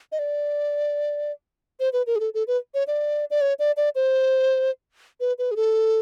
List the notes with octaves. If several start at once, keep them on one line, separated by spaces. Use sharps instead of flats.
D#5
D5
C5
B4
A#4
G#4
A4
A4
B4
C#5
D5
D5
C#5
D5
D5
C5
B4
B4
G#4
A4